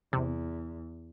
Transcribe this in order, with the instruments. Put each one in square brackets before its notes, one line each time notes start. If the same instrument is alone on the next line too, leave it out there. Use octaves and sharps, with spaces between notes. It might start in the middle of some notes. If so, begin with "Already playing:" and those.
[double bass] E2 [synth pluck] C3